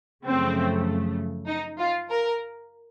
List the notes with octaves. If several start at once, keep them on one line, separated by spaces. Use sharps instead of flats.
F#2 C#3 F3 A3 C4
D#4
F4
A#4